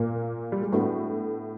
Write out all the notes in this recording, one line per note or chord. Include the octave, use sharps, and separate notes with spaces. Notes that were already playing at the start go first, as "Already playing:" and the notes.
Already playing: A#2 A#3
G3
G#3
A2 A3 B3 D4 F#4 B4